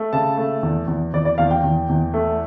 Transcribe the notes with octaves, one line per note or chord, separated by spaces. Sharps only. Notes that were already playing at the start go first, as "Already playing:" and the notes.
Already playing: A3
C#3 A5
A3
E2
E2
E2 D5
D5
E2 F5
G5
E2
E2
A3